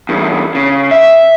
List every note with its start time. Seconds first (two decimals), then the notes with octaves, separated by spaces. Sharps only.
0.09 E2 G2
0.55 C#3
0.91 E5